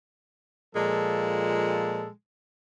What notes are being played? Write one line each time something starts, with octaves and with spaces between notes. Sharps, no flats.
A#2 F3 G#3 A4